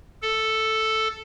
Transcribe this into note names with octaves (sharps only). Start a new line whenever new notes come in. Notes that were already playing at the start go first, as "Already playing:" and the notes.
A4